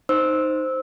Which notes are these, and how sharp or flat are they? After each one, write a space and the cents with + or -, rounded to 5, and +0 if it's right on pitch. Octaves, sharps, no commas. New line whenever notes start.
D#4 +0 C5 +0 E6 -15